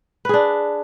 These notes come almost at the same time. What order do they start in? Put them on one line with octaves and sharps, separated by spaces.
B4 G#4 D4